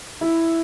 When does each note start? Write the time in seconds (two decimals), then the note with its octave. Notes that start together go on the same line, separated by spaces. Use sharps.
0.21 E4